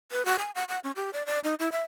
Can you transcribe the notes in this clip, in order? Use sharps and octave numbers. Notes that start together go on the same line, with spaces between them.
B4
F#4
G#5
F#5
F#5
C#4
G4
D5
D5
D#4
E4
E5